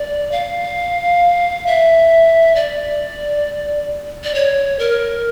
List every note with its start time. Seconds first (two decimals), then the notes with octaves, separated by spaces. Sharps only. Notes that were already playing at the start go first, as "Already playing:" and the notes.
Already playing: D5
0.32 F5
1.67 E5
2.55 D5
4.24 D5
4.35 C#5
4.79 A#4